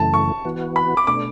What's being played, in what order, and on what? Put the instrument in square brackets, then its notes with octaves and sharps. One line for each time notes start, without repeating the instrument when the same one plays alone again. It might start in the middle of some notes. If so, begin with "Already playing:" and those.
Already playing: [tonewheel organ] F#2 C#3 E3 A3 [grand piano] A5
[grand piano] C#6
[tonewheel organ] E3 B3 F#4
[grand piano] B5
D6
[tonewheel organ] B2 A3 D4 [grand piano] D6